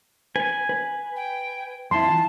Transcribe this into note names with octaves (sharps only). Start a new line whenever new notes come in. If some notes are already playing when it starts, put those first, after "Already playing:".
B4 G#5
B4
G5
F2 E4 A5 C6
E3 F4